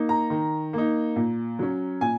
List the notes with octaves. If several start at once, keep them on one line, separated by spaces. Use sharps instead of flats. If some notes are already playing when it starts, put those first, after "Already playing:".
Already playing: A#3 D#4
A#5
D#3
A#3 D#4
A#2
F#3 C#4
A#2 G#5